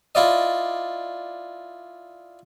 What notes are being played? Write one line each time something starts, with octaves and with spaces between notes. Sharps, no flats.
E4 F4 D5 D#5